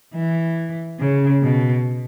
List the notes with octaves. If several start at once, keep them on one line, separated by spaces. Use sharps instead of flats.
E3
C#3
B2